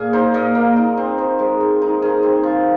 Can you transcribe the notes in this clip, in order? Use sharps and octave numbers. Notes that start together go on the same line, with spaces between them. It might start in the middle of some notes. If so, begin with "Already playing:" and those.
Already playing: A#2 G#4
D#4 C5
A#2 D#5
A#3
D#4
C4
D#3 C5
G#3 C5
D#3
D#4
D#3 G#4
C4
F3